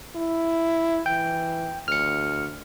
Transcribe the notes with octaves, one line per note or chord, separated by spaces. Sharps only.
E4
E3 G5
D2 F6 C#7